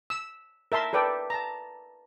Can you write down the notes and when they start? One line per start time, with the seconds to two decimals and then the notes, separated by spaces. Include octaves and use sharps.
0.10 E6
0.72 A#4 E5 A5 C6
0.93 A4 B4 D5 G5
1.30 A5 A#5